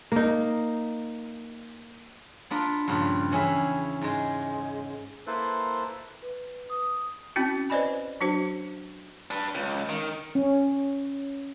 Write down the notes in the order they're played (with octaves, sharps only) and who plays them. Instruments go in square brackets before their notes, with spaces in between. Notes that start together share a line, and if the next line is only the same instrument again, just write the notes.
[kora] A#3 D#4
[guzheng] B3 D4 F4 A#4
G2 A#2 C#3 F3
E2 C#4 E4 G#4 E5
G#2 G#3
[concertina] A#3 E4 A4 B4 C5
[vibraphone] B4
D#6
[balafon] C4 C#4 E4 F#4
B4 C5 D5 D#5 G#5 B5
F#3 D4 F#4 C5
[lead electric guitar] D4 B4
C#2
D#3
[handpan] C#4